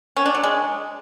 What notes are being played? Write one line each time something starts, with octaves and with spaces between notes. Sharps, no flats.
C#4
D4
F#3
G#3